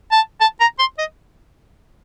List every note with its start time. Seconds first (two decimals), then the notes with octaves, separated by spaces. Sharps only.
0.12 A5
0.41 A5
0.60 A#5
0.79 C6
0.99 D#5